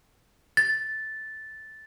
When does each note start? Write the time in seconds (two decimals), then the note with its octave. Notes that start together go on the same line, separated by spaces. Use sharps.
0.57 A6